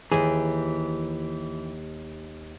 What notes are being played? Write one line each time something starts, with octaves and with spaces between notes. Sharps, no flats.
D#2 E3 G4 G#4